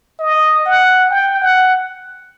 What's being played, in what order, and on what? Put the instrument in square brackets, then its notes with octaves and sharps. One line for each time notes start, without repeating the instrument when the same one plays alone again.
[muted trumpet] D#5
F#5
G5
F#5